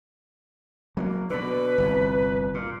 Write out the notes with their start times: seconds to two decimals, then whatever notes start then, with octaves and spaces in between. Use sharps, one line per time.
0.97 F#3 A3 A#3
1.30 B2 D3 B4
1.78 G1 C2 F2
2.54 A#2